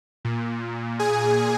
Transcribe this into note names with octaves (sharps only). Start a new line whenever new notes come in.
A#2
G#4 G#5